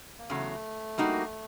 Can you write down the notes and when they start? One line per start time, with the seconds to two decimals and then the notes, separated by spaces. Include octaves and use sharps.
0.19 A#3
0.30 E2 C#3 F#3 A3
0.98 G3 A#3 D#4 F#4